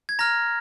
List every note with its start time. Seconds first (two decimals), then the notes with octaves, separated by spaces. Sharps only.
0.09 G#6
0.19 A#5 F6 A#6